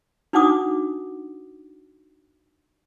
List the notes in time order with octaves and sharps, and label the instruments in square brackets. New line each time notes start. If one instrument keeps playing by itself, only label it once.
[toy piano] D4 D#4 F#4 F#5 D6 D#6